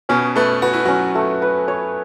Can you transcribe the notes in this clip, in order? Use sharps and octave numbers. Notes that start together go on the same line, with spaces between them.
B2 B3 C#4
A3 A4 B4
F#4 B4
E4
F#3 C#4 F#4
A3
B4
C#5